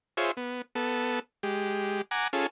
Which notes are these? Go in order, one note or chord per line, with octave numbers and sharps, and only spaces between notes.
F4 G#4 C5 C#5 E5
B3
B3 A4
G#3 G4
F#5 G#5 A#5 D6
C#4 F4 G#4 A4